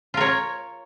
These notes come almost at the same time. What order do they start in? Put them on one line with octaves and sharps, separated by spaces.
F4 A#4 C#5